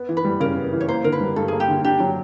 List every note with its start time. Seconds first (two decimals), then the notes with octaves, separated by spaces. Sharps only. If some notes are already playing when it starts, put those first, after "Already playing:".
Already playing: B3
0.09 E3
0.17 B4
0.25 G3
0.40 C#3 A#4
0.57 B3
0.73 E3
0.81 C#5
0.88 A#3 C5
1.04 D3 A#4
1.12 B4
1.21 G3
1.36 G2 A4
1.48 A#3 G#4
1.60 G4
1.68 D3
1.85 D4 G4
2.00 F#3